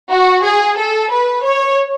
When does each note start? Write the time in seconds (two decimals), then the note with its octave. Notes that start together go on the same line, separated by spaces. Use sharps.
0.12 F#4
0.45 G#4
0.78 A4
1.12 B4
1.45 C#5